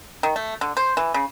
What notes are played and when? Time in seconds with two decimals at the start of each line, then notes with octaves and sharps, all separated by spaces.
0.23 D#3
0.36 A3
0.61 D3
0.77 C5
0.97 E3
1.14 C#3